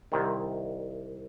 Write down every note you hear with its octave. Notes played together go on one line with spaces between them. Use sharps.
C2 C3 D#3